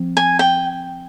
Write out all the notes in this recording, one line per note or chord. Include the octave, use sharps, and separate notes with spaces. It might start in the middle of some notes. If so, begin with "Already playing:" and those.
Already playing: F3 C4
G#5
G5